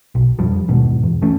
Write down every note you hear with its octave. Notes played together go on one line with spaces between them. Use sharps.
B1
F2 F3 G3
D#2 G#2 B2
E2
F1 E3 A3 C#4